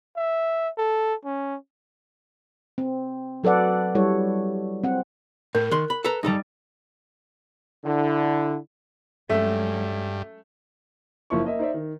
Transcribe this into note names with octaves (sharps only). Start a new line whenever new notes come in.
E5
A4
C#4
C4
F#3 A4 B4 D5 F#5
G3 E4 A4 C#5
C4 F#5
A2 A#4
D#3 C6 F#6
B5
A4 B4 A#5
G2 G3 D#4 A4 A#5
D3 E4
G2 F#3 G#3 A3 C#4 E5
F#1 F3 A#3 E4 C#6
A#3 D#5 E5
D#4 C5 D5 E5
D#3